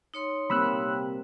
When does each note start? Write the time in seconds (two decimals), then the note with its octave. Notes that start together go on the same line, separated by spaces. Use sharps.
0.14 D#4 C#5 C6
0.50 C3 G3 A#3 C4 B5 E6 F#6